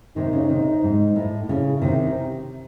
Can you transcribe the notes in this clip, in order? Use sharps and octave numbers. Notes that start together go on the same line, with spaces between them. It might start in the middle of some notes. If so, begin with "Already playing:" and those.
C3 D#3 D#4
C#3
C3 D#3
G#2
A2
C#3 E4
C3 D#3